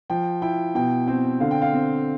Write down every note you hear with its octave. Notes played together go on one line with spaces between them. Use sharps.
F3 G5
E4 G5
B2 G5
C4 G5
D3 F5
G5
F5
C4